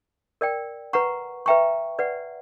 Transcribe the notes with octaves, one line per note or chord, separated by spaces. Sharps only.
A#4 D5 G5
B4 F#5 A#5 C#6
B4 E5 G5 A#5 C#6
B4 D5 F#5